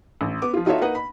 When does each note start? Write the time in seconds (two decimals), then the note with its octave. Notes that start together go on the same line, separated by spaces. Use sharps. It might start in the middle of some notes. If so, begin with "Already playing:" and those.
0.21 A1
0.42 B3 D6
0.53 F3 F4
0.66 D#4 F4 F#4 A4 C#5 E5
0.81 A#3 D#4 B4 D#5 F#5
0.95 B5